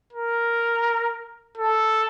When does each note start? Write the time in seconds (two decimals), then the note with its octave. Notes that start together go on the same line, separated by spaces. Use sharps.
0.13 A#4
1.58 A4